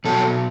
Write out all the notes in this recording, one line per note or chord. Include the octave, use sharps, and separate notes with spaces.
B2 F#3 A4